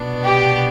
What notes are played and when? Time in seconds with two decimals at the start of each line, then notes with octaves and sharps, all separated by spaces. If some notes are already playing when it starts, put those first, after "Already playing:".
Already playing: C2 B2 B3 D4
0.23 G4